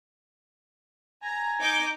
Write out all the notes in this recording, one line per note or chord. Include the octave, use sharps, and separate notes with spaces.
G#5 A#5
D#4 D6 G6